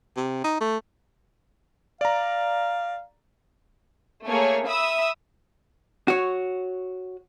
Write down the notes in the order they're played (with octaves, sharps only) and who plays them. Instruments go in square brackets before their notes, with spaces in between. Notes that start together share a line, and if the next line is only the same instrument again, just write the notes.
[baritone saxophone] C3
D#4
A3
[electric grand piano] D5 A#5 [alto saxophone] F5
[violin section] A3 A#3 G#4 C#5
E5 B5 D#6 E6
[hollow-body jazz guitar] F#4 C#5